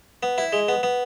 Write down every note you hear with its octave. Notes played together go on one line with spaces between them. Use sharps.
B3
E4
G#3
B3
B3